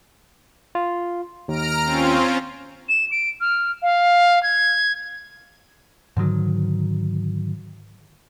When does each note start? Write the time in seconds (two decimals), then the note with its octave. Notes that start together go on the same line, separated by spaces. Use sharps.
0.75 F4
1.48 D#2 A#5 F6 D7
1.84 C4 C#4 F4
2.89 E7
3.11 D7
3.41 F6
3.82 F5
4.43 G#6
6.17 G#2 D3 D#3 F#3